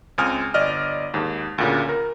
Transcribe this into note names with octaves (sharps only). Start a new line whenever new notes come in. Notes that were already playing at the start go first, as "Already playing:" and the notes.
C#2 C4 G#5 D#6 F6
G1 D5 D#5 F6
D#2 G#2
D2 A#2 C#3
A#4